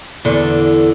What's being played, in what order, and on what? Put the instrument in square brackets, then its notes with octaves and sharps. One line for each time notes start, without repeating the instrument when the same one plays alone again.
[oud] E2 D3